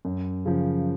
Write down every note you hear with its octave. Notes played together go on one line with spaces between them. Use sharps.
F#2
C#3 F3